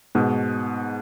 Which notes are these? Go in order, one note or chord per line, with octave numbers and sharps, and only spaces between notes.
G#2 B2